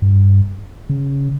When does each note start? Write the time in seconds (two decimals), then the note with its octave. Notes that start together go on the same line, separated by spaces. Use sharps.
0.02 G2
0.89 C#3